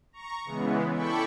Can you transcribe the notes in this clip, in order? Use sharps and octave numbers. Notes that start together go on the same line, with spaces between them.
A#5 C#6
C#3 E3 G#3 B3
E4 A4 D5 G5 B5 C#6